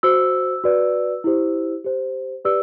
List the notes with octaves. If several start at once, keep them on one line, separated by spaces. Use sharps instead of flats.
F#4 C5 E6
F#4 B4 D5
E4 G4 C5
G4 C5
G4 B4 D5 E6